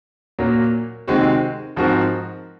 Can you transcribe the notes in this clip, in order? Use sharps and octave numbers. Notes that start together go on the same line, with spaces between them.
A#2 F#3 A#3
C3 D#3 G#3 C4 F#4
G#2 F3 C4 F#4 A#4